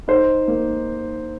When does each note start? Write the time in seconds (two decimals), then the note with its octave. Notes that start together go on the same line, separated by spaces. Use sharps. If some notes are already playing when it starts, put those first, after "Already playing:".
0.08 D#4 C5
0.48 A#3